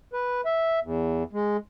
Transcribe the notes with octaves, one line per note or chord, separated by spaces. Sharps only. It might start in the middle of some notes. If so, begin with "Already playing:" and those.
B4
E5
E2
G#3